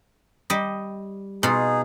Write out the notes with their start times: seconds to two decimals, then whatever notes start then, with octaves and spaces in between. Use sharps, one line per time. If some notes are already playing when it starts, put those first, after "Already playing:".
0.50 G3 D#5
1.43 B2 D#4 F4 G#4